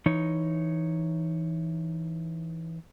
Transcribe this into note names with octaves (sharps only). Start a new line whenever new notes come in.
E3 D#4 C#5